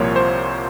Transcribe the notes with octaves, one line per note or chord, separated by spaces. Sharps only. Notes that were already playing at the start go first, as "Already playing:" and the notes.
Already playing: C2 A#2 F3 A#3 C#5
C5